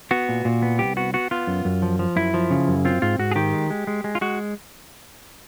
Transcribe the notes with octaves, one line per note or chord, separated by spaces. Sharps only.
B3 F#4
A#2
A#2
B3
C2 G4
B3 F#4
B3 F#4
B3 F4
F#2
F#2
F3
F3
F#2 E4
F3
C#3
F#2
C4 F4
G#2 F4
G#2 F#4
G#4
D#3 G4
G#3
G#3
G#3
G#3
F4
G#3 F#4